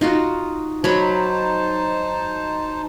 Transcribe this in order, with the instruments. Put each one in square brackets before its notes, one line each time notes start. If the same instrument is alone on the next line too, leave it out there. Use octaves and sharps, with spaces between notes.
[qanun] D#4 F4 F#4
[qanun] F#3 C#5 B5 [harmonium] D#4 C5 A5